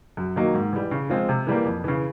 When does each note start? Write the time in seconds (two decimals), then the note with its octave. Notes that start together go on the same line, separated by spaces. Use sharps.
0.17 F#2
0.36 D#3 F#3 A#3 D#4
0.54 G#2
0.73 E3 G3
0.91 C#3
1.10 F3 G#3 C4 F4
1.29 C3
1.47 E3 G3 A#3
1.65 F2
1.84 C#3 E3